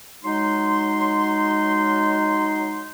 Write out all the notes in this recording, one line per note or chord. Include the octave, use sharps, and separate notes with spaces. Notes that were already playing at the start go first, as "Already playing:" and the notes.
F#3 G#3 D#4 C6